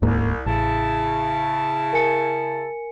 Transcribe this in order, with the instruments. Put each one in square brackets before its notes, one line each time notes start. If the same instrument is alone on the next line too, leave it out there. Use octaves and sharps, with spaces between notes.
[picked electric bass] D1 G#2 A#3 [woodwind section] C2
[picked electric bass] A1 [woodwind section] C#3 E4 A5
[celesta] A#4 G#5 C#7